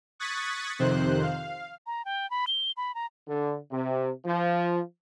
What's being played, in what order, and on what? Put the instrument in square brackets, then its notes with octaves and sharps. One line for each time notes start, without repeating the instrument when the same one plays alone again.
[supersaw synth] C#6 D#6 F#6 G#6 A6 B6
F2 C3 D#3 C5 F#6
F5
[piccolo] A#5
G5
B5
G7
B5
A#5
[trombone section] D3
C3
F3